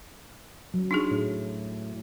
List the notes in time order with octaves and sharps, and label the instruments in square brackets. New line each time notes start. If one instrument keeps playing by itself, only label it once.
[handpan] F#3
[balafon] D4 D#4 G#4
[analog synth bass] A2